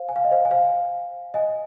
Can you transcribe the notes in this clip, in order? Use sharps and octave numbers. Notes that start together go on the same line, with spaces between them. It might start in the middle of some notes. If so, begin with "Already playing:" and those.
Already playing: C5 F5
G#5
F5
D#5
C5 F5
G#5
C5 F5
D#5 G#5